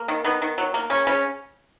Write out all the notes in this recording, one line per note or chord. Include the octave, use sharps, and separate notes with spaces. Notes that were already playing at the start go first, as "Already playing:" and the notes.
Already playing: A#3
D#3
D#3 B3
D#3
F#3
A#3
C#3 C#4
C#3 C#4